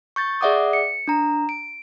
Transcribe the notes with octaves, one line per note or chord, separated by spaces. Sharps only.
C#6 G6 A6
G#4 D5 E5 F#5 D6 D#6
C#7
D4 A#5
D7